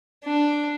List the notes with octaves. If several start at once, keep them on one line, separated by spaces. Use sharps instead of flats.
D4